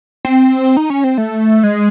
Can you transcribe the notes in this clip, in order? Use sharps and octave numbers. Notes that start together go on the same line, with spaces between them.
C4
D#4
C#4
C4
A3
G#3